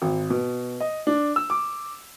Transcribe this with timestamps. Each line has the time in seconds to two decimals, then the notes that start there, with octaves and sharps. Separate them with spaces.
0.02 G#1
0.30 B2
0.80 D#5
1.07 D4
1.36 E6
1.50 D6